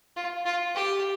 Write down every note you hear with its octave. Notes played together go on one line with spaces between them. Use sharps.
F4
F4
G4